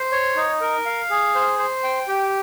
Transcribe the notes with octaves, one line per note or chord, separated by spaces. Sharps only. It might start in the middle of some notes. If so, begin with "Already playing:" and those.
Already playing: C5
C#5
D#4
A#4
F5
G#4
C5
C5
G5
G4